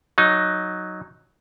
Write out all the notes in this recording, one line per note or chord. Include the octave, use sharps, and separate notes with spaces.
F#3 D#4